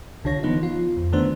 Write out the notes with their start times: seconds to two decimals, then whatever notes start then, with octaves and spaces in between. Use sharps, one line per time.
0.24 C2 D3 F4 C#5 A#6
0.43 E3 F3 B3 D#4
0.63 F4
0.97 F2
1.12 D3 D#3 A3 B3 D4 C5